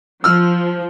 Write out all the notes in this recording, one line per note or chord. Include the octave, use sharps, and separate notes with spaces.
F3 E6 F6